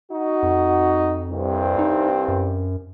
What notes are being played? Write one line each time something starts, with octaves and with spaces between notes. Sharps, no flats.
D#4 F#4
F2
C2 G2 C4
D#4
F#2